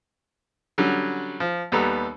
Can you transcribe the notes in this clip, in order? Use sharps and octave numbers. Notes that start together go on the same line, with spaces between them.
D3 F#3 G3 C#4
F3
D#2 G3 B3 A4 A#5 E6